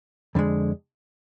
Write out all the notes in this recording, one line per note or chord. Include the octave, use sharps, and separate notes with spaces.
F2 D3 G#3